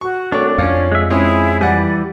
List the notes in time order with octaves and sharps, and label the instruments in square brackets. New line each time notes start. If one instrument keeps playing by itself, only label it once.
[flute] F#4 [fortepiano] C#6
[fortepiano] C2 A3 C#5 [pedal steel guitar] D4 D5
[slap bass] F2 [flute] C#4 [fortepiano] F5
[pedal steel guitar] G#3 E5
[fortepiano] G#3 C4 C#4 [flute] E4 [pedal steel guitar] G#4
[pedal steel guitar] E3 G3 G4 [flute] D5 [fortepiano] F#5 G#5